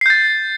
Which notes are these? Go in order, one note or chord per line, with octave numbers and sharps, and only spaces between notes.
G6 A6 C7